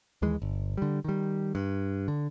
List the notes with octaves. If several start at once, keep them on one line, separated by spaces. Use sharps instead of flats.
D#2 E3 G#3
G1
D3 G3
D#3 G3
G2
D3